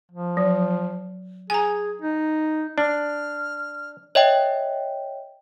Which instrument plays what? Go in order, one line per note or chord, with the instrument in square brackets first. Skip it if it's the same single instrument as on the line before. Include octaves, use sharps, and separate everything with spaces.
[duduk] F3
[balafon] F#3
[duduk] G#4 [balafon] G#5 A#5
[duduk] D#4
[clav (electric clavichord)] D4 [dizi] F6
[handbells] C#5 D#5 E5 G5